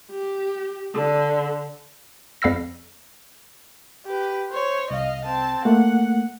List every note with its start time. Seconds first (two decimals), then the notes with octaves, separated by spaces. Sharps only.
0.11 G4
0.94 D3
2.42 F2 F5 B5 E6 A#6
4.06 G4 B4
4.51 C5 C#5
4.90 C2 D#5 F5
5.25 C4 A5
5.65 A3 A#3 F#5